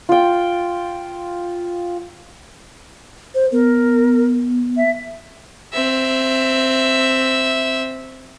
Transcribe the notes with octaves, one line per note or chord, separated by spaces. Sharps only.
F4 G5
C5
B3 A#4
E5
C4 E5